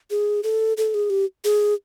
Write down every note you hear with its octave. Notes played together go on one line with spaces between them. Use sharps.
G#4
A4
A4
G#4
G4
G#4